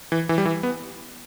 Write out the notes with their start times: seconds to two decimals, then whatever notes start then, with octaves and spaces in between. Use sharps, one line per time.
0.12 E3
0.29 E3
0.38 G3
0.45 E3
0.63 B3